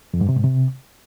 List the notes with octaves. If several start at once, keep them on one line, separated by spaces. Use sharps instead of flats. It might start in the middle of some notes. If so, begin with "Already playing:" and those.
F2
G2
C3
G#2
C3